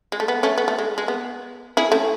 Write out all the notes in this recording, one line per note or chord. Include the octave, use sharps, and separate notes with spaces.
G#3
A3
B3
A3 C#4
B3
A3
G#3
G#3
B3
E4 G#4
A3 C#4